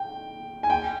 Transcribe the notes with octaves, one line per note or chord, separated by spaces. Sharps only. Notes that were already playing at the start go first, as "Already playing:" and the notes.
Already playing: G5
G#5
G5